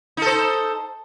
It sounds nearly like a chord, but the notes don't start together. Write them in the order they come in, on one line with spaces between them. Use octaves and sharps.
D#4 A4 C5